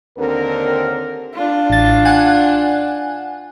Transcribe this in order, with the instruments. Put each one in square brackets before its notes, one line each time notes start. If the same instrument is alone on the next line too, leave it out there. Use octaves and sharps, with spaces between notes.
[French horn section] D#2 D3 C4 A#4
[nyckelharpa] D4 F4
[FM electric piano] A1 A6
F#5 G#5 F#6